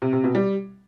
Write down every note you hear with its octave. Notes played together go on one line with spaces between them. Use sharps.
C3
C3
B2
G3